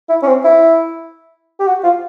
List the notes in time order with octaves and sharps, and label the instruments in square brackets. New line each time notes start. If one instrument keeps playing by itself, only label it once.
[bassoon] E4
C#4
C4
E4
G4
F#4
F4